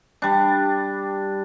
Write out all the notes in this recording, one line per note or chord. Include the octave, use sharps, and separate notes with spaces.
G3 D4